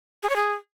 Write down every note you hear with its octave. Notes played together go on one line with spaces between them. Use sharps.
G#4
C#5
G#4